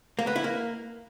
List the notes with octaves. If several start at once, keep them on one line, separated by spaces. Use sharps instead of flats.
A#3
B3
E4
A#3